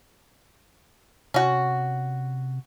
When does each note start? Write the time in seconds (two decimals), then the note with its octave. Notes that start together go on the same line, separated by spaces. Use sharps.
1.34 C3 C#4 F#4